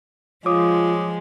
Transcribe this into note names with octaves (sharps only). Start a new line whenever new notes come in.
F3 G#3 F4 C#5 D6 D#6